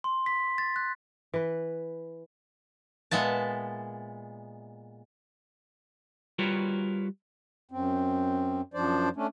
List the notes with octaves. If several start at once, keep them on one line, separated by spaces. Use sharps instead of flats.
C6
B6
A6
F#6
E3 B4
A#2 G#3 B3 E5 A5
G3 F4 F#4 A#4 B4 C#5
F#2 C4
F#2 F3 D4 C5 D5
A3 C#4 D4